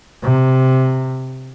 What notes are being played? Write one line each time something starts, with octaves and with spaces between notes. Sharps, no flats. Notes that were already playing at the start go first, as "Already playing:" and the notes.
C3